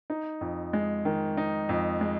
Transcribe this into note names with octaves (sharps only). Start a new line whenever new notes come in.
D#4
F2
G#3
D#3
D#4
F2
G#3